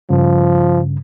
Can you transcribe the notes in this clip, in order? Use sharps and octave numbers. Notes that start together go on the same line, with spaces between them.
G2 C#3 F3